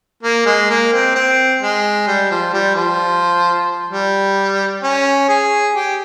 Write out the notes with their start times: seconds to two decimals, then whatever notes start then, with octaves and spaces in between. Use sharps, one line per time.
0.23 A#3
0.46 G#3
0.70 A#3
0.93 C4
1.15 C4
1.61 G#3
2.07 G3
2.31 F3
2.53 G3
2.75 F3
3.91 G3
4.83 C#4
5.28 G#4
5.75 G4